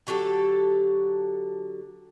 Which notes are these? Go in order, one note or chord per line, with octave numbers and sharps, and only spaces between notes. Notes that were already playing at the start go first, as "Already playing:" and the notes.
D3 F#3 G4 A4